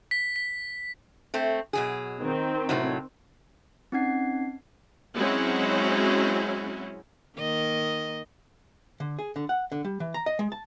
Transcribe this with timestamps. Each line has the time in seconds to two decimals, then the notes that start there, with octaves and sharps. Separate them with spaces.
0.11 B6
0.36 B6
1.34 A3 C4
1.73 B2 F#3 G#4
2.22 D#3 C4
2.69 A2 C3 F#3
3.92 C4 C#4 D#4 F#5 G#6 C7
5.15 F#3 G#3 C4 C#4 E4 F#4
7.37 D#3 A#3 D#5
9.00 D3
9.19 G#4
9.36 D3
9.49 F#5
9.72 D3
9.85 G3
10.00 E3
10.14 A#5
10.26 D#5
10.39 G#3
10.52 A5